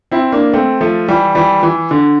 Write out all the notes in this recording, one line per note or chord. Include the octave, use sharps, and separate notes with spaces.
C4 E4
A#3 D4
A3 C4
F3 A3
E3 G3
E3 G3
E3
D3